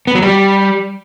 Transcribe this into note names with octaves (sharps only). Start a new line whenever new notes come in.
B3
F#3
G3